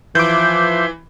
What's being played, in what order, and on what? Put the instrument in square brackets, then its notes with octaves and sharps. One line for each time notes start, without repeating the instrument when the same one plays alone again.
[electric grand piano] E3 [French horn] F3 [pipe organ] E5 C6 [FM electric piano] D6 G6